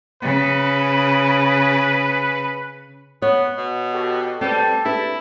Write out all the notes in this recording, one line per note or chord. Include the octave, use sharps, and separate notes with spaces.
C#3 B4
B3 C#5
B2
F#4 G4 A4
G3 C4 A4 B4
D4 E4 G4 B4